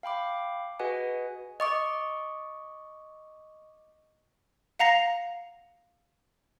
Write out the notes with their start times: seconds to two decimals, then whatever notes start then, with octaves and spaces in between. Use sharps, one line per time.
0.03 F5 G5 B5 D6
0.79 F#4 G#4 B4 D#5 F#5 G#5
1.60 D#5 C#6 D6
4.79 F5 F#5 A#5 A#6 C7